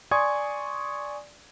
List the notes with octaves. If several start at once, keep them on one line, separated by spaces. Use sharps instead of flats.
D5 G#5 C6 C#6 D#6 G#6